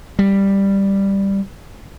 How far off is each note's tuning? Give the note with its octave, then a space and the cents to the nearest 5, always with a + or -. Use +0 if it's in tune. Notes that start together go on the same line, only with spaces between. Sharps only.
G3 +5